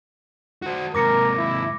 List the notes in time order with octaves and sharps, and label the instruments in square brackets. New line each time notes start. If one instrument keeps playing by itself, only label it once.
[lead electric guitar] F#4 C5
[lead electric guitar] G#2 C3 [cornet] A#4 [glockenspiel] D6 A#6 C#7
[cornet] E4